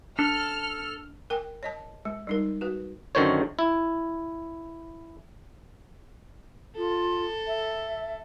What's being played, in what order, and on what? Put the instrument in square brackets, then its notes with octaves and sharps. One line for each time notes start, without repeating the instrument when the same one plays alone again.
[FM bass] D4 [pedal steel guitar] A4 [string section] F6
[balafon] A#4 G5 G#5
C#5 D#5 A5
G#3
G3 D#4 A#4
F#4 B4
[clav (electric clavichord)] F#2 D3 D#3 C5 C#5
E4
[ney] F4 [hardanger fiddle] A4
[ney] E5